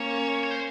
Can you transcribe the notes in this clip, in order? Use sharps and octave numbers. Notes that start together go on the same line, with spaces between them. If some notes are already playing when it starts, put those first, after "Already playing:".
Already playing: A#3 C#4 C#5
C#5
C5